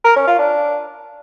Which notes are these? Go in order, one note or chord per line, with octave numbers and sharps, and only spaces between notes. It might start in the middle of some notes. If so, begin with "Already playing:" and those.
A#4
C#4
F4
D4